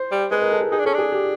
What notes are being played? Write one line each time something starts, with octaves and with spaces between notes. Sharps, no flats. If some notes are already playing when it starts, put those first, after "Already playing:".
Already playing: C5
G3
G#3 B4
A#4
A4
G#4
D#4 G#4
D4
C#4 A4
D4 G#4
G4